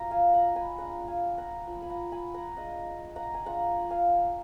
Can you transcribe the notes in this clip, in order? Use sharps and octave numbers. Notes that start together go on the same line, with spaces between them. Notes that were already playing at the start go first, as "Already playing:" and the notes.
Already playing: F#3 A#3 F4 D#5 A#5
F5 G#5
F#5 A#5
G#5 B5
G#3 B3 D4 F4 F#5 A#5
F5 G#5
F#5 A#5
F3 A#3 F4 B5
G#5 B5
F#5 A#5
G#5 B5
F#5 A#5
G#3 D4 F4 D#5 F#5
F#5 A#5
G#5
G#3 D4 F4 F#5 A#5
F5 G#5